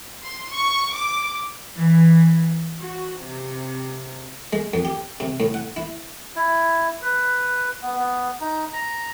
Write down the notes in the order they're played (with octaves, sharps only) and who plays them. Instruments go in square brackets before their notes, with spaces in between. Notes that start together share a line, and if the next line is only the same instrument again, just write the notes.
[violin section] C6
C#6
D6
[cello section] E3
F#4
C3
[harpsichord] G#3
F2
G4
C3
A2
F#5
E4
[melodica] E4
B4
B3
B3
D#4
A#5